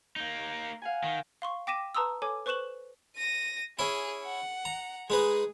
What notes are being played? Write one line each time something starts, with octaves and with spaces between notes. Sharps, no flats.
A#3 D#4
F5 F#5 G#5
D#3
F5 C6 C#6
G5 D6 A#6 B6 D#7 E7
B4 A5 A#5 C6 D#6 E6
A4 C#5 G#5 D6
B4 C5 C#6 F#6 E7 F#7
A#6 D#7
C#4 E4 G#4
F#5
A#5
G#3 D#4 G#4 B4